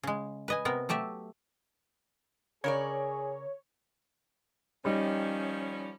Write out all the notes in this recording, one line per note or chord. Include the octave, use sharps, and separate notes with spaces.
C#3 G#3
B4 D#5 G#5
C3 B3 A#4
F#3 A3 G4 E5
C#3 G#4 A#4 C#5 D5
D#3 F3 G3 C#4 D#4